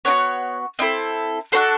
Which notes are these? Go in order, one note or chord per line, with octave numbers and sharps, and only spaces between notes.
B3 D4 C#5
F#4
C4 E4 A4 D#5
D4 F#4 A4 C5